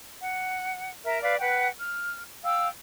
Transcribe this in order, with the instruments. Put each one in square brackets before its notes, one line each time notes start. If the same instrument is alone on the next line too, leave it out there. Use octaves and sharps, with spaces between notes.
[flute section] F#5
A#4 E5 A#5 F6
B4 D5 F5
B4 F#5 G5
F6
F5 G5 E6